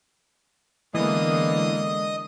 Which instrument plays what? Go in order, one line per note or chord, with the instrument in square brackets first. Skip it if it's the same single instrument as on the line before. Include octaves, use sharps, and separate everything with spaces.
[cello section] D3 G#3 [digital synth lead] E3 [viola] A#3 B3 [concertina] D#5 D#6